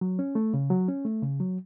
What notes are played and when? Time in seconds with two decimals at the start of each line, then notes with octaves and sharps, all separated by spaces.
0.01 F#3
0.19 C#4
0.35 A3
0.54 C#3
0.70 F#3
0.88 C#4
1.05 A3
1.22 C#3
1.40 F#3